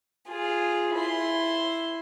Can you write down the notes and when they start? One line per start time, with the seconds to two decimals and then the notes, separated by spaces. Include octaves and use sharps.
0.30 F4 G#4
0.96 E4 C6